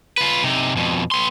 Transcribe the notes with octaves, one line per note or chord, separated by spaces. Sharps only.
F4 B4
C3 D#4
F2 B2
B3 C6